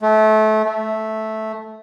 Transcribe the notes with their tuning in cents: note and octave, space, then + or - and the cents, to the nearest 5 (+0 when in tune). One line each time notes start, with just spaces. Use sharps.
A3 -25
A3 -10